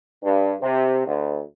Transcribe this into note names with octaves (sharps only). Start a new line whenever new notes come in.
G2
C3
D2